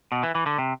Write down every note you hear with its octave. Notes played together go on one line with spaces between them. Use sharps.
B2
E3
E3
D3
C3